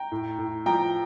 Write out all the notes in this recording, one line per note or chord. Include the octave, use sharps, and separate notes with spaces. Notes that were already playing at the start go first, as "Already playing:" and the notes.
Already playing: G5 A#5
A2
A2
F3 G5 A#5